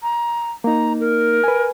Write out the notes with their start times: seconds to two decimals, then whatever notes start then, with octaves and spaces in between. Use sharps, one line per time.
0.03 A#5
0.64 A#3 D#4 A#5
1.00 A#4
1.44 B4 G#5